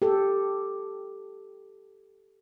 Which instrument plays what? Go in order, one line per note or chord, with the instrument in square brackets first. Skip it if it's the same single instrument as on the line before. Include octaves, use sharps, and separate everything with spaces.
[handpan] G4 A4